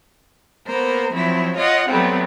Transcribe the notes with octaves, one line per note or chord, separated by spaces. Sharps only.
A#3 B3 A#4 C5
F3 F#3 C4 E4
F4 C#5 D#5 F#5
F#3 G3 A3 B3 C4